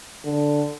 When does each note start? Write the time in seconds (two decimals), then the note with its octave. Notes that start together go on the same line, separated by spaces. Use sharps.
0.24 D3